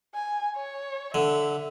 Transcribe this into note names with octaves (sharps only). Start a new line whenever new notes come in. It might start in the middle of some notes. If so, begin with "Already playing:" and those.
G#5
C#5
D3 E5